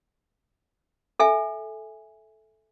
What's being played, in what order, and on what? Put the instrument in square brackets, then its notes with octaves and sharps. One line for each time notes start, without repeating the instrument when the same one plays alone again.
[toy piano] A4 E5 G#5